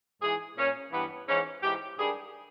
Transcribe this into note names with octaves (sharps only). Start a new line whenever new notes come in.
G#2 E3 G#4
A#2 C#4
G2 E3 B3
G#2 E3 C#4
G#2 E3 G4
G2 D#3 G#4